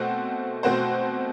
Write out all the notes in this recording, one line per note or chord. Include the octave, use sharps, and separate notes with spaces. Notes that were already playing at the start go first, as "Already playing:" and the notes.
Already playing: B2 A3 C4 F#4 C5
B2 A3 C4 F#4 C5